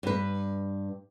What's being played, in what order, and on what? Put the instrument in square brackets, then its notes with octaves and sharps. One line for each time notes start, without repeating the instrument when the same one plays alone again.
[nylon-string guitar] G2 B4